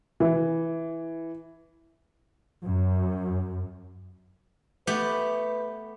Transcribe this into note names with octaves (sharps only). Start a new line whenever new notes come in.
E3
F#2
A3 B3 G4 B4